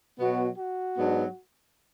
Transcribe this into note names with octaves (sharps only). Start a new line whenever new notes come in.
B2 F#3 B3 F#4
F#4
G#2 F#3 B3 D4